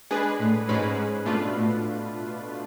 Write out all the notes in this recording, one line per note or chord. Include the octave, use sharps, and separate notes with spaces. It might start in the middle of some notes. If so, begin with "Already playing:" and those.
G#3 D4 G#4 B4
A2
G#2 G#3 C#4 G#4 B4
B2 A3 D4 F4 B4
A2